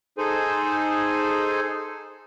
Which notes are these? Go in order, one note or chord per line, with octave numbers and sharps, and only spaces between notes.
D#4 G#4 A4 C5 G#5